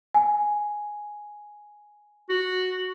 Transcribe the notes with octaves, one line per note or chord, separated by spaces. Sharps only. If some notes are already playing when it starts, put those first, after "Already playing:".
G#5
F#4